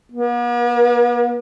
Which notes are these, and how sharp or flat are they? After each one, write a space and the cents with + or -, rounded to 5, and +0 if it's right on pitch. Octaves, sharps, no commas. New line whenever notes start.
B3 -45